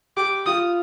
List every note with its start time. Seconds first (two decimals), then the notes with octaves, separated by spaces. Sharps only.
0.17 G4 D6
0.46 F4 D#6